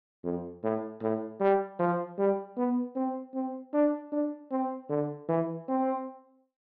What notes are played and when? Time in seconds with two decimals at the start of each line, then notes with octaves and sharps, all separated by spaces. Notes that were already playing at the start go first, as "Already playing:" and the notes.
0.24 F2
0.63 A2
1.02 A2
1.40 G3
1.79 F3
2.18 G3
2.57 B3
2.96 C4
3.35 C4
3.74 D4
4.12 D4
4.51 C4
4.90 D3
5.29 E3
5.68 C4